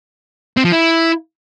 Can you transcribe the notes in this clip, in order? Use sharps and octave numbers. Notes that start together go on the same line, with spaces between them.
C4
F3
E4